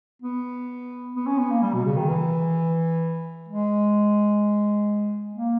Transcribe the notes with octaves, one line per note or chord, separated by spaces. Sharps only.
B3
B3
C#4
B3
A#3
G3
B2
C#3
D#3
E3
G#3
A#3